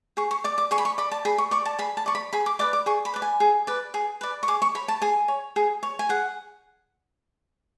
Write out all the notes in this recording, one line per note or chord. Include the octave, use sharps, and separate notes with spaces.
G#4 C#6
C#6
D5 D6
D6
G#4 C#6
B5
C#6
D5 B5
A5
G#4 B5
C#6
D5 C#6
A5
G#4 B5
A5
D5 C#6
B5
G#4 B5
D6
B4 D5 D6
D6
G#4 C#6
B5
B4 D5
G#5
G#4
B4 D5
G#4
B4 D5
C#6
G#4 D6
C#6
C#5 B5
A5
G#4 G#5
C#5
G#4
C#5
G#5
G#4 F#5